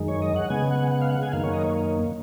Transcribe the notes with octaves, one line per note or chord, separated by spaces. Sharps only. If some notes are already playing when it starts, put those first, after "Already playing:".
Already playing: F#2 D#3 G#3
C#5
D#5
F#5
C#3 G#3 B3 G#5
F#5
F#5
F5
F#5
G#5
F#2 D#3 A#3 F5
C#5
D#5
C#5